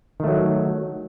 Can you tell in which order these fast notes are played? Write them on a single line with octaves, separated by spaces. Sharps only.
D#3 A3 F#3